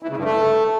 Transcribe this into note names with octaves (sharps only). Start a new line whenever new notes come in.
E3
C#3
G2
A3